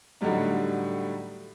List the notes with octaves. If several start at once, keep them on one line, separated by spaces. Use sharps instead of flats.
A2 D3 F#3 G3 D#4